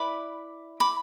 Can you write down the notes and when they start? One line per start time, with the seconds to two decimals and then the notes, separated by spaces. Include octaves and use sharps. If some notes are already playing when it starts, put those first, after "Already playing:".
Already playing: E4 B4 D5 B5 D6
0.80 B5 D6